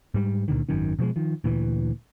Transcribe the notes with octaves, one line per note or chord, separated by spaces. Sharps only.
G#2 G3
C#2 A#2 D3 D#3
G#1 F#2 D#3 C#4
B2 F3 G3 G#3
D#3 F3
D2 A#2 E3